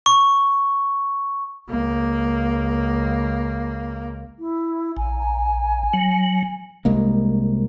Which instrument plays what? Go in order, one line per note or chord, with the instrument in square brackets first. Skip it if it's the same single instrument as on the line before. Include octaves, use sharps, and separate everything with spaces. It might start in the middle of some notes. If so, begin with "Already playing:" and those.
[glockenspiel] C#6
[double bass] C#2 A#3
[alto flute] E4
[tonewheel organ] A#1 [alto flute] G#5
[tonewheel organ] F#3
[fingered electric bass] C2 G#3 A#3